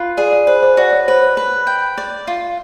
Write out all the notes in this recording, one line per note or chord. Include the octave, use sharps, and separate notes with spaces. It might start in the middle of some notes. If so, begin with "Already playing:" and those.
Already playing: F4 B4
G#4 D5
D5
B4 C5
C5
F#4 D5
C#5
B4 C5
C#5
B4
G5
D5
F4